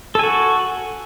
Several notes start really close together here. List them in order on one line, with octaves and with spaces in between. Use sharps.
A4 G#5 F#4